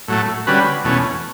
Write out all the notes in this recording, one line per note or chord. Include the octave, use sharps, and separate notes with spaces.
A2 F#3 A3
D3 G3 C#4 F#4 B4
E2 B2 A3 C#4